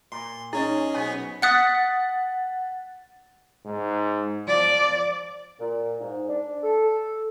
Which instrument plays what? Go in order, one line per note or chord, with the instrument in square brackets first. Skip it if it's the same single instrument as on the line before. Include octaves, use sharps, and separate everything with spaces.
[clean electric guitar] A#2 [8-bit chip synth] C6
[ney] C#4 [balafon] D#4 [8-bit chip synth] G#4 C#5 D#5
[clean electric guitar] B1 B3 [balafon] C5 G#5
[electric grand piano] F#5 A6 B6 [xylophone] D#6 F#6 C#7
[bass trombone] G#2
[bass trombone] F3 [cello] D5
[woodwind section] A#2
G#2
D4
A4